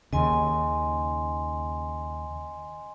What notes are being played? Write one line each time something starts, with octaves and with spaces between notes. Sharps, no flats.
D#2 C#3 D#5 G#5 C6